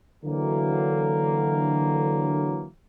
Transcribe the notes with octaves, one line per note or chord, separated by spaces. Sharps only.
D3 E3 F#3 A#3